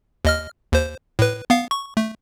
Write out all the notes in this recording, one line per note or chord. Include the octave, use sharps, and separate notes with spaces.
D#2 D#5 F6
D#2 C5
A2 B4
B3 F5
C#6
A3